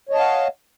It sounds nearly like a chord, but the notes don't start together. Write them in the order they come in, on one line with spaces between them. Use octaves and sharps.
C#5 D#5 A5 F5 F#5